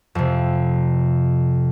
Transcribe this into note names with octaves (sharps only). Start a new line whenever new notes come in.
F2 C3